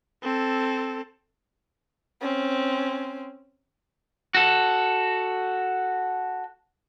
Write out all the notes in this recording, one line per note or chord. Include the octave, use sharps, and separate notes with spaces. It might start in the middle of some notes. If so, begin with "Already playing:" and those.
C4 A4
C4 C#4
F#4 A4